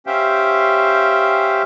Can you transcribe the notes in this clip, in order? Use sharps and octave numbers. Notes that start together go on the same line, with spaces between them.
C#4 G4 C5 E5 F5 G5